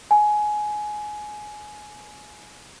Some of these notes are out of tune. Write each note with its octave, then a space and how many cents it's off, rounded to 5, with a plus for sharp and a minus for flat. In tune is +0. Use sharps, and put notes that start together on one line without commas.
G#5 +15